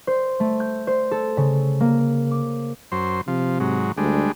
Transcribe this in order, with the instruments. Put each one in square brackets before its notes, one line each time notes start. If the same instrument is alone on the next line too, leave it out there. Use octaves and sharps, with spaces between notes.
[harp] C5
A3
G6
C5
A4
C#3
A#3
D6
[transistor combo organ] F#2 C5
[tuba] C3 [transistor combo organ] F3
[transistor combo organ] G#2 F#3
[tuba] D2 [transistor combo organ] G3 G#3 D4